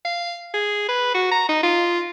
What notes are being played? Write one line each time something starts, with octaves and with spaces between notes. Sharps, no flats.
F5
G#4
B4
F#4
A#5
D#4
F4